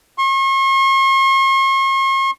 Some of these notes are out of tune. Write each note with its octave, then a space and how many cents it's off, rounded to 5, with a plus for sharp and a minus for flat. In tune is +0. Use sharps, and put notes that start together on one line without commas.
C#6 -45